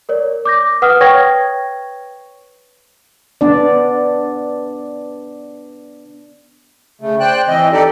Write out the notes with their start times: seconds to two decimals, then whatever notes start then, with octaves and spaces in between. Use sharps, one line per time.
0.09 A#4 C#5 D5
0.45 D6 G6 A#6
0.82 B4 F#5 D#6 F6
1.00 B4 C#5 G5 C#6 G#6 A#6
3.41 B3 D4 D5
7.01 C#3 A3
7.20 C5 D5 G5 F#6
7.48 E3 C4 D#5
7.72 D#4 G4 A4 D5